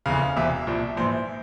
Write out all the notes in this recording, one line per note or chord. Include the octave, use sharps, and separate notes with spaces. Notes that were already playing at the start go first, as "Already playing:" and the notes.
F1 E2 C#3 F5
E1 E2 C3 E5
C2 A#2 F3
A#1 G#2 E3 C5